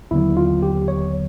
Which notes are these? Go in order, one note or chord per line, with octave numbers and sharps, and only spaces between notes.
D#2 D3 F#3 B3 E4
F4
G4
C#5